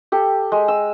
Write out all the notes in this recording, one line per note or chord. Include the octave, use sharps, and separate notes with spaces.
G4 A4
G#3
E6